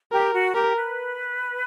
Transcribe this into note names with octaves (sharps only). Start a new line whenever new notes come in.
G4 A#4
F#4
G4 A#4
B4